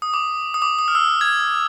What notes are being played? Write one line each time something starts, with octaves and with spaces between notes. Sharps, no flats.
D#6
D6
D#6
D6
D#6
F6
E6
G#6